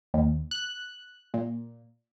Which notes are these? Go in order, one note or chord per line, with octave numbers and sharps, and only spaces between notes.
D#2
F#6
A#2